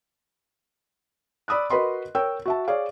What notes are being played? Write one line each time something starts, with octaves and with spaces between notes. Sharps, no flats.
D5 B5 D#6 E6 F#6
F#4 A#4 B4 D#5 B5 C6
A#4 C#5 G5 E6
F#4 E5 A5
G#4 C#5 D5 F5